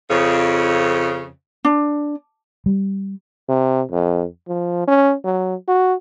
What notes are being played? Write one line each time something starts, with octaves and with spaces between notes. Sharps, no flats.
F2 C#3
D4
G3
C3
F2
F3
C#4
F#3
F#4